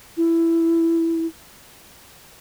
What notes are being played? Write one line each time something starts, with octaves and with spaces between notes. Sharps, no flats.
E4